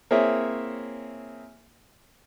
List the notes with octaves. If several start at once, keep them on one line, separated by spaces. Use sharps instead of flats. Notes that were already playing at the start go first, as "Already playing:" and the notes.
A#3 C4 E4 G#4 C#5 E5